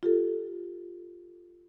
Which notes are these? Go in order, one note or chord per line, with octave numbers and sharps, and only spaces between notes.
F4 G4 A4